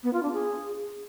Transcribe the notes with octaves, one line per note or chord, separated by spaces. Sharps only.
B3
F4
D4
G#4